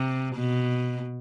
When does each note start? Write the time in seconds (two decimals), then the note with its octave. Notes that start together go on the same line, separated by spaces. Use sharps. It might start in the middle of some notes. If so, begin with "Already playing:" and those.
Already playing: C3
0.36 B2